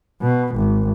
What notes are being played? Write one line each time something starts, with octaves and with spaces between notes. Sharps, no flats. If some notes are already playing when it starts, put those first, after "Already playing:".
B2
G#1